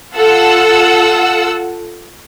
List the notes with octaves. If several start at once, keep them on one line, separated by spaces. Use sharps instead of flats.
F4 A4 F#5 E6